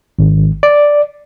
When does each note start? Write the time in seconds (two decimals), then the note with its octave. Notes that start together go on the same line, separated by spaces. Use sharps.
0.19 G#1
0.63 D5